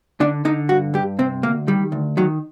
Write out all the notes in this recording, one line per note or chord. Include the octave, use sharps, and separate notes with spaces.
D3 D4
D3 D#4
G2 F#4
G2 G4
C3 C4
D2 A#3
D#3 G3
D2
D#3 F#3